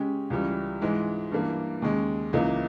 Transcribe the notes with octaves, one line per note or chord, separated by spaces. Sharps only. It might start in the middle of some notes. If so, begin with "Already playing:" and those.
Already playing: C#3 G#3 C#4 G4
C#2 C#3 E3 G3 C#4
G#2 E3 G#3
G2 E3 A#3
D#2 C#3 G#3
C#2 C#3 E3 A#3 D#4